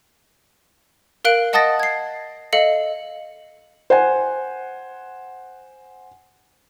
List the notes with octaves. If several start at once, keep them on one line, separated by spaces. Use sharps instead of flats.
A#4 F5 F#6 D7 F#7
D#5 F#5 A5 D#6 A6 A#6
G#6 C7
A4 D#5 F5 C#7
C5 F#5 G#5